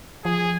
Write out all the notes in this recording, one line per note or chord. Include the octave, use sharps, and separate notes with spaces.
F3 G#4